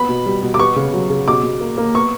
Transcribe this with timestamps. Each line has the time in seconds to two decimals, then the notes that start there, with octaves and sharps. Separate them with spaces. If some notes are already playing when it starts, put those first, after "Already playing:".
Already playing: B3 B5
0.09 B2
0.26 G3
0.43 B2
0.54 D6
0.60 B3 C#6
0.76 C#3
0.93 F#3
1.10 C#3
1.27 B2 D6
1.43 B2
1.61 A#3
1.78 A#3
1.95 B3 C#6